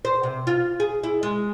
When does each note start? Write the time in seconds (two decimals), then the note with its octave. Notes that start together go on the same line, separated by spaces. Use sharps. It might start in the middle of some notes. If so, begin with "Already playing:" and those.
0.05 C5
0.23 C3
0.47 F4
0.80 G#4
1.03 E4
1.23 G#3